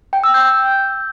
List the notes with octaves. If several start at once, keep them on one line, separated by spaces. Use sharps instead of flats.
G5
E6
G6